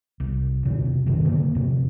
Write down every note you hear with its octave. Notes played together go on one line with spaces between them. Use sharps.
C2
F2 B2 D3
C3
A1 F#2 C3 D#3
D3 A#3
F2 C3